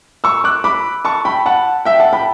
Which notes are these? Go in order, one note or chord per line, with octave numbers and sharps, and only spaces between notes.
C#6 E6
D6 F#6
B5 D6
A5 C#6
G5 B5
F#5 A5
E5 G5
F#5 A5
G5 B5